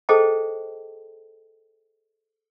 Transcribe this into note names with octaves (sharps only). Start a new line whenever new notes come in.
G#4 A4 C5 D#5 G5 A5